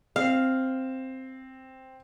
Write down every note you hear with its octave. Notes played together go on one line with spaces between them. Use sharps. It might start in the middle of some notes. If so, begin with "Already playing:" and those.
C4 F5